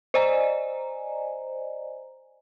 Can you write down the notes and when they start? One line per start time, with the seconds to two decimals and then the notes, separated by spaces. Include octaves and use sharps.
0.14 C5 D5 D#5 G#5 A#5